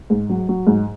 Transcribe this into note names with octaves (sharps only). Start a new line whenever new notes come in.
G#2
F#3
F#3
G#2